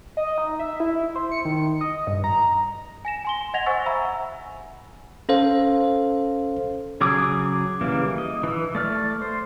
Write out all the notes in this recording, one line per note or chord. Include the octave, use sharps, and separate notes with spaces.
D#5
D#4
E5
E4
C5
C#7
D#3
D#5
G2
A#5
G#5 A#6 E7
G#5 C6 G7
D#5 F#5 G#6 A#6 F7
C5 F#5 G#5 C#6 E6 A6
E5 F5 G#5 A#5 B5 E6
C#4 A4 C5 F5
C#3 F#3 G#4 D6 E6
C#3 E3 G3 A#3
D#5
E3 E6
A3 D5 F6
C5